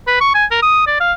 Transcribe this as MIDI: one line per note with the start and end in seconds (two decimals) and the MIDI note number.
0.07 0.18 71
0.20 0.30 85
0.34 0.45 80
0.51 0.58 70
0.62 0.84 87
0.87 0.95 74
1.00 1.13 77